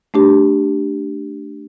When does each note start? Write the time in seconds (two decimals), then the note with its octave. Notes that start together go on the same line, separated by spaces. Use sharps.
0.14 A3 D4 G4